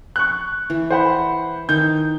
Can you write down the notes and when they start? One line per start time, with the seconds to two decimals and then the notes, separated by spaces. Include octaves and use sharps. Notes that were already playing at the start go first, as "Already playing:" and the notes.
0.16 C#6 F#6
0.70 E3
0.90 C5 F#5 B5
1.69 D#3 G6